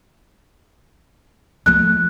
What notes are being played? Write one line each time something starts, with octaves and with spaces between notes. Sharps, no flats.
F3 A3 F#6